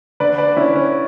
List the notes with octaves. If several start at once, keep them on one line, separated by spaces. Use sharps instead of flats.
D3 B4 D5
B4 D5
D3 C#4 E4
C#4